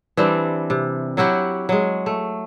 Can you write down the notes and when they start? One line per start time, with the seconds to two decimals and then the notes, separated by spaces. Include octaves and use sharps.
0.17 E3 G3 C4 D4
0.70 C3
1.17 F#3 E4 F#4 G4
1.69 F#3 G#3
2.06 A3